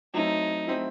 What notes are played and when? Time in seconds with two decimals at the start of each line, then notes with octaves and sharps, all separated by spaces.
0.14 F#3 A3 C4 D#4 E4
0.67 F#3 A3 C4 E4